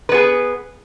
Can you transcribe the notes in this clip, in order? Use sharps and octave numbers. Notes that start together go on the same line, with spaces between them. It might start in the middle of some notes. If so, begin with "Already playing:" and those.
B3 G#4 B4